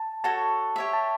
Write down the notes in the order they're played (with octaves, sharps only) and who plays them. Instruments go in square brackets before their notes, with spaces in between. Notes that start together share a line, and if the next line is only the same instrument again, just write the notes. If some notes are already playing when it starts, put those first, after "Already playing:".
Already playing: [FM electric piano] A5
[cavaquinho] F#4 A4 C#5 [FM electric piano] A5
[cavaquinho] G4 C#5 E5
[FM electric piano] A5